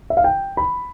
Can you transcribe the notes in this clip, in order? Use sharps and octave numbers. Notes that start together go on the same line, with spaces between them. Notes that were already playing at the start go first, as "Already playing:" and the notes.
E5
F5
G5
B5